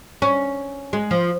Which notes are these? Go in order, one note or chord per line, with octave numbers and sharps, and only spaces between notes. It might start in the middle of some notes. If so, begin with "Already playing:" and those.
C#4
G#3
F3